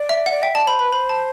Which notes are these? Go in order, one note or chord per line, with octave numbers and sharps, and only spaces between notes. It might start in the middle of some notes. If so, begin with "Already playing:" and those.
Already playing: D5
E5
D5 F#5
E5 G5
D5 A5
C5 B5
B4 B5
C5 B5
A5